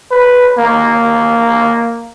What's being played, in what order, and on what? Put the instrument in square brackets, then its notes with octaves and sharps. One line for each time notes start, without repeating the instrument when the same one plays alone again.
[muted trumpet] B4
A#3